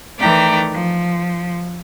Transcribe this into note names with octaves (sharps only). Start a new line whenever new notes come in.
D#3 E3 A3 D5 G5 A#5
F3